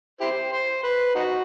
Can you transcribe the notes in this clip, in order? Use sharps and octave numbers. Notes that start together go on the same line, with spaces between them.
E4 G4 C5
C5
B4
D#4 F#4